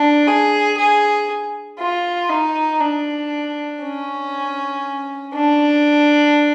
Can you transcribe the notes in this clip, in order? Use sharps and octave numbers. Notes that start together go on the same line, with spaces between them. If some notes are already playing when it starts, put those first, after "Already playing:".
Already playing: D4
G#4
G#4
F4
D#4
D4
C#4
D4